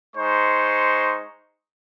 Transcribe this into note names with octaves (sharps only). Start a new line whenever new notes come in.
G#3 D#4 C5 C#6